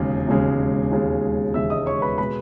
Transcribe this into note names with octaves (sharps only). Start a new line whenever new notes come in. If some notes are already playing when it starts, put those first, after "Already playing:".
Already playing: E1 D#2 C#3 G#3
E1 D#2 C#3 G#3
E1 D#2 C#3 G#3
E1 D#2 C#3 G#3 E5 E6
D#5 D#6
C#5 C#6
B4 B5
B2 G#3 B4 B5